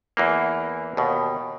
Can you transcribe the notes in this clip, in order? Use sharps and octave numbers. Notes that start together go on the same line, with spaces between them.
E2 E3 A#3
D#2 B2